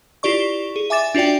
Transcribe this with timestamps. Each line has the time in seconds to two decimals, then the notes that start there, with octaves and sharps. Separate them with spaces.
0.23 E4 F4 G4 D5 C#6
0.76 G#4
0.90 E5 G#5 D6 A6 E7
1.15 D4 F4 F#4 D5 G5